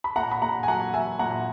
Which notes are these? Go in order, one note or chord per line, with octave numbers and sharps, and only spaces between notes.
B5
A#2 F#5 A#5
B5
A#2 F#5 A#5
G#5
F#3 F#5 A#5
F#3 E5 G#5
A#2 F#5 A#5